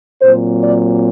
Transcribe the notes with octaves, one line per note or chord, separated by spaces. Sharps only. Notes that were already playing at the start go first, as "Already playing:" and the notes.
A#2 F#3 C4 C5
D5